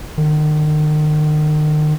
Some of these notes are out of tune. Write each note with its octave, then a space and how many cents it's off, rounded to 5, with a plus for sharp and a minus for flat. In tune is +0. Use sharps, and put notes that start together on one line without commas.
D#3 -40